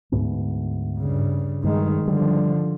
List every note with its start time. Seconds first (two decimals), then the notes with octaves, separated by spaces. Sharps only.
0.12 D2 G#2 B3
0.98 G2 C#3
1.64 G2 D#3 G#3
2.07 D3 F3 G3